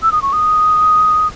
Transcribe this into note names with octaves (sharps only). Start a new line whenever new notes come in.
E6
D#6
C#6
D#6